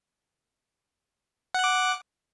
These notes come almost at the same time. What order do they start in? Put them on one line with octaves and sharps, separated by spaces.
F#5 F#6 D6